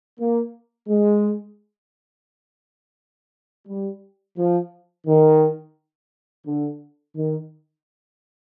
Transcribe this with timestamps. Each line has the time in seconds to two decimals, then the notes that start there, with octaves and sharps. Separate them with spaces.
0.19 A#3
0.89 G#3
3.68 G3
4.38 F3
5.07 D#3
6.47 D3
7.16 D#3